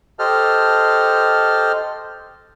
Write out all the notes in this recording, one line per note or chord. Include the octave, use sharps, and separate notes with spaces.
G4 A4 C5 D#5 A5 F6